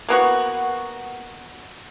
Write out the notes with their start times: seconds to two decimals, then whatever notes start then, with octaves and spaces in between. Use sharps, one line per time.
0.09 A#3 B3 F#4